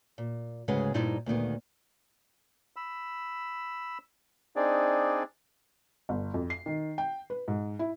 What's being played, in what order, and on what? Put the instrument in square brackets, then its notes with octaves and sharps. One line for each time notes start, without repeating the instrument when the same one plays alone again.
[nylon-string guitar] A#2
D2 G#2 C#3 G#3 B4 F#5
G2 A#2 D#4 E4 C5 D5
D2 A#2 D#3 B3
[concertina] B5 E6
C4 D4 D#4 G#4 D5
[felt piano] G1
F2
C7
D#3
G5
B4
G#2
E4